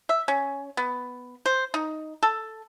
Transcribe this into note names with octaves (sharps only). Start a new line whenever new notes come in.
E5
C#4
B3
C5
D#4
A4